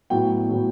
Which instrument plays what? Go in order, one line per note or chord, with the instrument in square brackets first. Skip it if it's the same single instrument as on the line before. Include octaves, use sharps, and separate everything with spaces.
[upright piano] A2 F#3 B3 G5
A2 F#3 B3